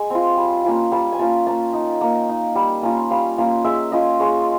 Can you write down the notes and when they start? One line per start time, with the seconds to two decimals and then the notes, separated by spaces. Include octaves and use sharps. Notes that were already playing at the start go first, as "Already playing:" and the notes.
Already playing: G#3 G#5
0.10 C4 F4
0.37 G3
0.64 A#3 C#4 F4
0.91 G3 A5
1.12 G#5
1.19 A#3 C#4 F4 A5
1.47 A#3 A5
1.73 D#4
2.01 A#3
2.29 D#4
2.55 G3
2.83 A#3 C#4 F4
3.11 G3 F5
3.38 A#3 C#4 F4
3.64 G#3 E5
3.92 C#4 F4 D#5
4.20 G#3 C#5